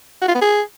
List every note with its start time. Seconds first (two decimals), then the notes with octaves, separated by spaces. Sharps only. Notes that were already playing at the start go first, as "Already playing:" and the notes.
0.21 F#4
0.28 F4
0.35 B3
0.41 G#4